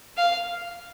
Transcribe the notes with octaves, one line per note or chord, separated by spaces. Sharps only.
F5